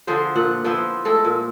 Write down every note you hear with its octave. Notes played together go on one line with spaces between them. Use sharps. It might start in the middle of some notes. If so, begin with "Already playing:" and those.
D3 F3 G#4 C5
A#2 F3 F#5
F3 B3 E4 C5
G#3 A3 A4
A#2